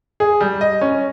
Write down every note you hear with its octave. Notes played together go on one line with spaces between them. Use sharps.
G#4
G3
D#5
C#4